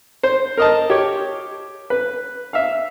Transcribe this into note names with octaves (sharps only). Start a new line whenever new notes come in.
C5
A#4 D#5 A5
G4 C#5
B4
E5 F5